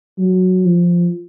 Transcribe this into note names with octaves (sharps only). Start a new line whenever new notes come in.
F#3
F3